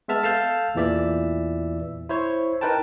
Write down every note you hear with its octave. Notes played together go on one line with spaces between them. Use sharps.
G#3 B3 E5 A5 F6
A4 F5 A5 F6 G6
E2 A#2 E3 D5 E5 E6
E4 C5 C#5
D#4 A#4 B4 G5 A5